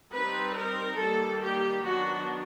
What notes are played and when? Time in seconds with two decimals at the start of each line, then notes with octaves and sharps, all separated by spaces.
0.13 G3 C4 D#4 B4
0.56 A#4
0.98 D#3 G3 A#3 A4
1.42 G4
1.84 D#3 F#3 B3 D4 F#4